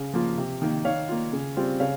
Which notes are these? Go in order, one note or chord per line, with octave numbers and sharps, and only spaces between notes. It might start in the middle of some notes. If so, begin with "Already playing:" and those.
Already playing: C#3 F5
F3 A#3 F4
C3
D#3 A#3
D#3 C#5 F5
A#3 F4
C#3
G3 C4 F4
C#3 C#5 F5